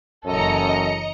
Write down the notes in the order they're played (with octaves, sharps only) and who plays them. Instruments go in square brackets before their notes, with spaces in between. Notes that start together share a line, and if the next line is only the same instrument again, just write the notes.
[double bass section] F#1 E3 C#4 [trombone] F#2 [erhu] A4 [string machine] D#5 A#5 C#7